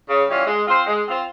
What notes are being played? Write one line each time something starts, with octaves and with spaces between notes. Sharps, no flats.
C#3
E3 G3 C#4 F4
G#3
C4 F4 C5
G#3
C4 F4 C5